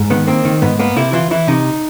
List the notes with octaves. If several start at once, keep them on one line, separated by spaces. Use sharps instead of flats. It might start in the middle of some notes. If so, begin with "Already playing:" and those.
Already playing: G#2
D#3 B3
A#3 C4
D#3
G#2 B3
A#3 B3
C3 E4
E3 F4
E3 E4
C3 D#4